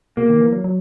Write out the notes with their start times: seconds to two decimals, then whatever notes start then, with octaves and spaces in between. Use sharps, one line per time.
0.17 B2 A#3
0.30 D#3
0.41 E3
0.52 F#3
0.64 F#3